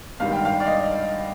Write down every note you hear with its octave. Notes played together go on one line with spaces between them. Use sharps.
G#1 G2 D#3 G3 F5
G5
F5
D5
D#5